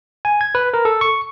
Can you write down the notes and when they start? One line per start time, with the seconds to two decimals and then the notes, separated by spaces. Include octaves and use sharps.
0.25 G#5
0.41 G#6
0.55 B4
0.74 A#4
0.85 A4
1.01 C#6